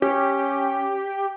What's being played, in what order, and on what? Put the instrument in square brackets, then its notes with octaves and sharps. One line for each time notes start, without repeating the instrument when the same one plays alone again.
[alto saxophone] C#4 [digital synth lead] G4